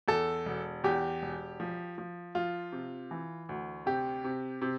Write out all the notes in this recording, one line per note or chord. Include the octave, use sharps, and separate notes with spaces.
E2 A4
E1
E2 G4
E1
F3
F3
F3 F4
C3
E3
D2
C3 G4
C3
C3